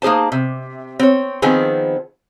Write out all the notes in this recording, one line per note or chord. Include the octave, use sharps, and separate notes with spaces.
A#3 D#4 G#4 C5 A5
C3
C4 C#5
D#3 F3 B3 C4 G#4